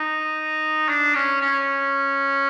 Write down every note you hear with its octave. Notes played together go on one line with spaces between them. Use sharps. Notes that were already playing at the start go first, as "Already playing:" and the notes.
Already playing: D#4
D4
C#4
C#4